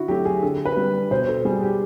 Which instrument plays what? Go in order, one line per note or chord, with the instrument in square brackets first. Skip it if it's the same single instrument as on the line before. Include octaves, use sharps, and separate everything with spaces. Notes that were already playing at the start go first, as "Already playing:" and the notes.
Already playing: [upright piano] D3 E4 F#4
F#3 A3 G4
G#4
D3 A4
B4
G3
B2 C5
A4
G3 G#4
G4